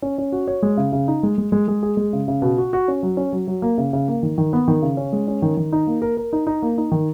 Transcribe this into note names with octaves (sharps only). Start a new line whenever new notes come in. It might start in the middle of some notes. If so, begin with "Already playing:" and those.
C#4
C#4
F#4
C#5
G#3
C#3
C#3
D#4
G#3
G#3
G#3
G#3
G#4
G#3
C#3
C#3
B2
F#4
F#4
C#4
F#3
C#4
F#3
F#3
A#3
C#3
C#3
A#3
D#3
D#3
B3
D#3
C#3
C#4
G#3
C#4
D#3
D#3
D#4
A#3
A#4
A#4
D#4
D#4
A#3
D#4
D#3